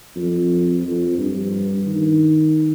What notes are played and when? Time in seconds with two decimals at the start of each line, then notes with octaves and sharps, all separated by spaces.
0.16 F2
0.84 F2
1.18 G2
1.87 D#3